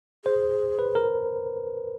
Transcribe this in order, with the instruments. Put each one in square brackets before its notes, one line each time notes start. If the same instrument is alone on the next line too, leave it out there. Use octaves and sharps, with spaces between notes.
[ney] G#4 [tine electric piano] C5
[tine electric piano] B4
A#4